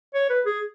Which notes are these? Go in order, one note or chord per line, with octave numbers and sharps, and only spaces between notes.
C#5
B4
G#4